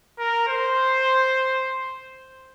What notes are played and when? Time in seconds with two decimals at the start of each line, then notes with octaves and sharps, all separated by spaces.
0.19 A#4
0.48 C5